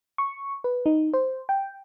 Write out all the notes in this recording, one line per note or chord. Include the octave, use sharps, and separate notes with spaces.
C#6
B4
D#4
C5
G5